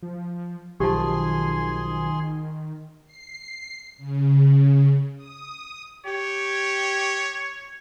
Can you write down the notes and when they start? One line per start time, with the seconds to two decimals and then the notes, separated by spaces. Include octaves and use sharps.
0.02 F3
0.80 B1 D#3 F3 G4 G#4 G#5 A5 C6
3.06 C7
3.97 C#3
5.16 D#6
6.06 G4 C#5